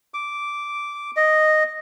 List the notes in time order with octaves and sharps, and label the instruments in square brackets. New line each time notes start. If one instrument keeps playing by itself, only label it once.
[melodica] D6
D#5